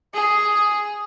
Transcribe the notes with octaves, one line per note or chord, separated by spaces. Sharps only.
G#4